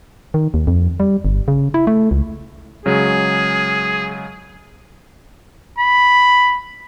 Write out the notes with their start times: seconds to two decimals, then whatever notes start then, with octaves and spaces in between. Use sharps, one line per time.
0.34 D#3
0.54 D#2
0.67 F2
1.00 G3
1.25 G1
1.48 C#3
1.74 E4
1.87 A3
2.11 C#2
2.86 C#3 F#3 G#3 G#4
5.78 B5